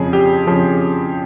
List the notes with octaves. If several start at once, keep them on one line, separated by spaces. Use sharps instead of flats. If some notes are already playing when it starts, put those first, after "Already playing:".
Already playing: F2 C#3 F3 G#4
G4
F2 C#3 F3